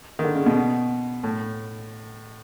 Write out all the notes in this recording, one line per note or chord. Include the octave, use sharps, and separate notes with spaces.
D#3
D3
C#3
B2
A2